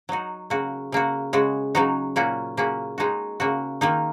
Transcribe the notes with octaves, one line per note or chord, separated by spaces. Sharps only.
F#3 D#4 F#4
C#3 A#3 F#4
C#3 A#3 F#4
C#3 G#3 F#4
C#3 F#3 D#4 F#4
A#2 A#3 C#4 F#4
C#3 A#3 C#4 F#4
G#3 D#4 F#4
C#3 A#3 F#4
D#3 A#3 D#4